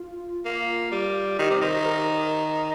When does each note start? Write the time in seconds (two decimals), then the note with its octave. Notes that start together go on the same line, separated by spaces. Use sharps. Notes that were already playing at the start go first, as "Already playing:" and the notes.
Already playing: F4
0.45 A#3
0.92 G3
1.39 D#3 G4
1.50 C3
1.61 D#3 C5
1.86 A#4